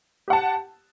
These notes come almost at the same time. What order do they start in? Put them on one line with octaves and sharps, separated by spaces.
G4 F#5 A5